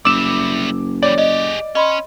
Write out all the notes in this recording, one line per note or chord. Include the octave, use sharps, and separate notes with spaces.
F#1 G3 E4 D6 E6 E7
E3 G3 C#5 D5
G4 G#4 D#5
C#4 D#5 B5 C6